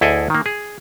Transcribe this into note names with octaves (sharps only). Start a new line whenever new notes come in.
D2 E4 G#4 A4 D#5 G#5
D#3 A#3
G#4